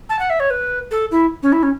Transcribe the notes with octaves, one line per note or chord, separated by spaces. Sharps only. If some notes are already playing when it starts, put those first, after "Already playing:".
A5
F#5
E5
C#5
B4
A4
E4
C#4
E4
C#4